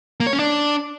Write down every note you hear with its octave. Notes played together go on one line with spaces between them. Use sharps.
A#3
C#5
C#4
D4